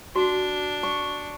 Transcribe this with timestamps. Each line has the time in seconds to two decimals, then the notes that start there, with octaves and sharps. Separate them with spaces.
0.16 D4 F#4
0.83 C#6